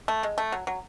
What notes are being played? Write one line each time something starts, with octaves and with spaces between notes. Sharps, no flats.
A3
G#3
A3
F#3
F#3